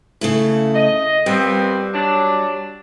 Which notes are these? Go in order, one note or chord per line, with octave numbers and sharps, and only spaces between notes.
C#3 A3 E4
D#5
A#2 G3 B3 C4
F#3 D4